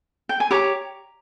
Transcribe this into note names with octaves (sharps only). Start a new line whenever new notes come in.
G5
G#5
G4 C#5 A#5